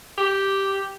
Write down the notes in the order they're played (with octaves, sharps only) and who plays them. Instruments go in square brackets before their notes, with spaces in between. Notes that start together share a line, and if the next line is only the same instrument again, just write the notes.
[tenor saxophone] G4